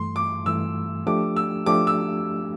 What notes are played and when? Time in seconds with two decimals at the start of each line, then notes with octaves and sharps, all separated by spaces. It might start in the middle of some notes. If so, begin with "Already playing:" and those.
Already playing: G2 E3 A3 C6
0.16 D6
0.46 G2 E3 A3 E6
1.07 F3 A3 D4 G4 D6
1.36 E6
1.66 F3 A3 D4 G4 D6
1.87 E6